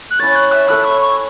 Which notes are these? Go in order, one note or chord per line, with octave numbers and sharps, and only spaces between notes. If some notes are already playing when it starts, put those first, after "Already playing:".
F#6
C#4 E4 C#5 A6
F#6
E5
E4 A4 C#5 E5 F#6
C#6
C#6